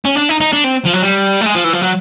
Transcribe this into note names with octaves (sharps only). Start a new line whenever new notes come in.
C#4
D4
D#4
D#4
D4
C4
F3
F#3
G3
A3
G#3
F3
E3
F3
F#3